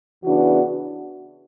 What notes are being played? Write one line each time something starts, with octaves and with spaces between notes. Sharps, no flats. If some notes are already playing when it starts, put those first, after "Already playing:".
E2 C#3 E3 B3 D4 F#4